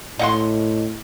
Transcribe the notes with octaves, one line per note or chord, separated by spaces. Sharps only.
A2 D#5 F#5 C6